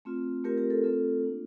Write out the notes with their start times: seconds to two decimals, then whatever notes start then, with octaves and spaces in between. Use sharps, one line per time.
0.05 A3 C4 F4
0.44 A3 C4 F4 G4 A#4
0.57 G4 A#4
0.70 A4
0.83 A3 C4 F4 A4
1.23 A#3 D4 F4